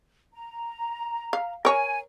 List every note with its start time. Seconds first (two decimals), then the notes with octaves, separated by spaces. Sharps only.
0.33 A#5
1.33 F5
1.65 A#4 C#5 G#5